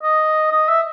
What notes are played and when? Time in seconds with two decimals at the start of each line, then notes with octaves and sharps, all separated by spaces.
0.03 D#5
0.52 D#5
0.69 E5